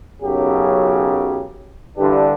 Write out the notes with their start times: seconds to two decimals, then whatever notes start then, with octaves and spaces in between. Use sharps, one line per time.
0.22 B1 F#2 C#3 F#3 G4
1.97 G2 D3 E3 D4 G4